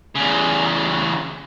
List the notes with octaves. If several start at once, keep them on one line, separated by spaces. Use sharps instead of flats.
E2 C#3